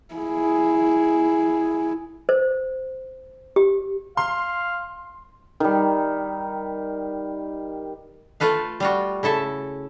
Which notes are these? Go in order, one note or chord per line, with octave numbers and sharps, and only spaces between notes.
E4 G#4
C5
G4
F5 C6
D#3 G3
A3 F4 A4 B4 F5
G3 F4 F#4
C#3 E4 A4 E5